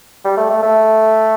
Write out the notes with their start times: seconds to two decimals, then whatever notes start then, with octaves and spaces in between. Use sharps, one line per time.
0.24 G3
0.37 A3
0.50 A3
0.62 A3